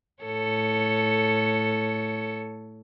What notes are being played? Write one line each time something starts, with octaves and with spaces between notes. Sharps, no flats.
A2 A4 C#5